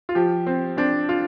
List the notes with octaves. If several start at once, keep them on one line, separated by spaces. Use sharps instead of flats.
F4
F3 G4
C4
C4 D4
F4